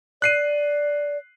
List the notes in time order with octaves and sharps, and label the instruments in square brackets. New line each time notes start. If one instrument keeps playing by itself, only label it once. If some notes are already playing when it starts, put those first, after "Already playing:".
[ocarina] D5 [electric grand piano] F#6 C7 D#7